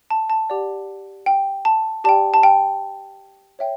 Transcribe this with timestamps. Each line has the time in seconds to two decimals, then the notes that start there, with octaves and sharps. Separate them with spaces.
0.10 A5
0.30 A5
0.50 G4 D5 F#5
1.26 G5
1.65 A5
2.04 G4 D5 G5 A5
2.34 A5
2.43 G5
3.59 C#5 E5 G5